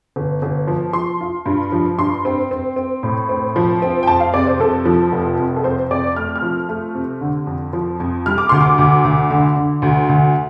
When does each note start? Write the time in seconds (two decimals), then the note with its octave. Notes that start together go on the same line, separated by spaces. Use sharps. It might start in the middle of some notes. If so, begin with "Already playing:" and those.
0.16 G1
0.42 G1
0.67 F3
0.93 F3 C6
1.21 F4
1.46 G2
1.72 F3
1.98 G2 C6
2.25 C4
2.51 C4
2.76 C4
3.03 A2
3.29 C4
3.56 F3
3.82 C4
4.03 G5
4.07 F2 A5
4.20 F5
4.34 C3 D5
4.47 C5
4.59 F2 A4
4.85 F3
5.12 F1
5.39 F2
5.56 A4
5.64 F2 C5
5.91 F2 D5
6.16 A3 F6
6.36 F6
6.42 F3
6.69 A3
6.95 C3
7.21 D3
7.47 F2
7.73 F3
8.00 F2
8.26 G3 F6
8.38 D6
8.49 D2 C6
8.61 D6
8.78 D2
9.04 D2
9.30 D3
9.56 D3
9.82 D2
10.09 D2